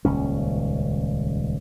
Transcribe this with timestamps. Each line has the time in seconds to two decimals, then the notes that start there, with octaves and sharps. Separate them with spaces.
0.05 D#1 C#2 C#4